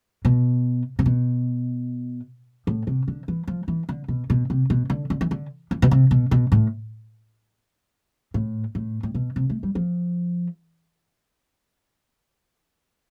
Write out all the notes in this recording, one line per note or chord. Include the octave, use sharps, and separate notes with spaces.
B2
C3
B2
A2
C3
D3
E3
F3
E3
D3
B2
B2
C3
B2
D3
D3
E3
D3
E3
B2
C3
B2
B2
A2
A2
A2
A2
B2
C3
A3
G3
F3